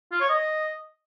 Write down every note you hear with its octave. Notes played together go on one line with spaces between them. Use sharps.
F4
C#5
D#5